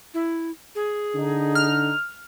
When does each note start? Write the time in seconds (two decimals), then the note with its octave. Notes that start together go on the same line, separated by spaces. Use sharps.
0.14 E4
0.75 G#4
1.15 D3 D#4
1.55 F6